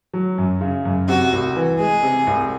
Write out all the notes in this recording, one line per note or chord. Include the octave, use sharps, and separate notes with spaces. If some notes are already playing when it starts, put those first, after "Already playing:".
F#3
F#2
C#3
F#2
C3 F#4
C2
E3
G#3 G#4
C3
C2